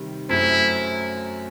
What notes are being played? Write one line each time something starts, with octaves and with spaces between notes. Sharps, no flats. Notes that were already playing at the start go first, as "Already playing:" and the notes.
Already playing: C3 D#3 G3
F#2 F#3 A3 C4 E4